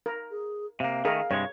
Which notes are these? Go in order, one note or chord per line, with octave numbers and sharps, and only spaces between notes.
A#4
G#4
C3 A#3 F5
D#3 A3 G#4 A#4
G2 C3 G#3 C#5